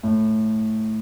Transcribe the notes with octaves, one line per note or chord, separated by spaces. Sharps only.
A2